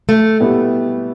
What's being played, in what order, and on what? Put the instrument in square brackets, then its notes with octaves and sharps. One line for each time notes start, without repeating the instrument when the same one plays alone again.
[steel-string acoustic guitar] A3
[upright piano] B2 G3 B3 E4 G4